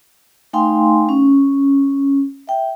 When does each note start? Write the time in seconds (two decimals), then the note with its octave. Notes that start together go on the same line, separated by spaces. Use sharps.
0.53 A3 D#4 F5 G5 G#5 C6
1.09 C#4
2.47 E5 G5